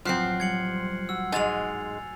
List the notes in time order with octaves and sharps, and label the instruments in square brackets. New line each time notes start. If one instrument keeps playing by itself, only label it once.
[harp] A1 F#3 [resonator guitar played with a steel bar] F3 C4 [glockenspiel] F6 F#6 C7
[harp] G3 [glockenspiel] G#6 C#7 F#7
[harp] F#4 [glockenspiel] E6
[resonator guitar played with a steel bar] G#2 G#3 [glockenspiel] G#5 A6 F7